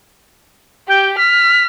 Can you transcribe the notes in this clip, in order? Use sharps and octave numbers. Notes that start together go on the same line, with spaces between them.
G4 G5
F6 B6